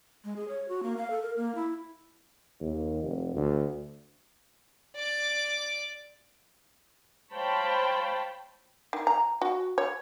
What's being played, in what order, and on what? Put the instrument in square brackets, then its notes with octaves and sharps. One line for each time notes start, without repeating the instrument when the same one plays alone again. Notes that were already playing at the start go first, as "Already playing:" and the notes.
[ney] G#3
G#4
C#5
F#4
A#3
F5
A4
A#4
A#3
E4
[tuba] D#2
F1
D2
[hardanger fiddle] D5 D6
[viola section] C5 C#5 F5 G5 A5 B5
[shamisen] D#3
A#5
F#4
C#5